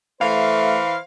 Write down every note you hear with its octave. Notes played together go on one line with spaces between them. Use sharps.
E3 A3 C5 F5